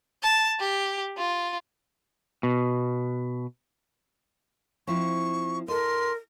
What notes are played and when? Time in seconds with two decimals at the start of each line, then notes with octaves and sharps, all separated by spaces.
0.22 A5
0.60 G4
1.17 F4
2.43 B2
4.87 F3 C4 E4 C#6
5.68 A4 A#4 D#5 C6